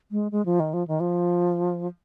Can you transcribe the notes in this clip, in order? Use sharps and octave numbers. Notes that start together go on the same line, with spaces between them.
G#3
G#3
F3
D#3
F3
D#3
F3